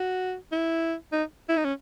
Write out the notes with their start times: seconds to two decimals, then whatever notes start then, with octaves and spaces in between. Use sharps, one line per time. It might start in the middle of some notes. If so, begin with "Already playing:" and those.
Already playing: F#4
0.52 E4
1.12 D#4
1.49 E4
1.57 D#4
1.65 C#4